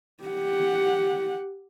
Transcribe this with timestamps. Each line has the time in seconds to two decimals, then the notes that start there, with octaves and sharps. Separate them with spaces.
0.23 G4 F#5